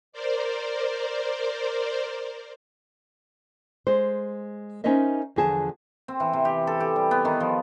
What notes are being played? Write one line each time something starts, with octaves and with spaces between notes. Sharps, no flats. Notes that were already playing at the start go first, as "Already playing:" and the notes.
A#4 C5 D5
G#3 C5
C#4 D#4 A#4 C5 D#5 E5
E2 D3 F3 G#4 F5 A5
C4
E3
C3
G4
A4
G4
G3
B3
D#3
F3